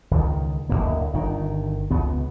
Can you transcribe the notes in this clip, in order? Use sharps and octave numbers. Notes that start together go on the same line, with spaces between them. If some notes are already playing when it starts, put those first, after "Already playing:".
C#2 D#3
D1 F2 A#3
G1 D#3
C#2 B3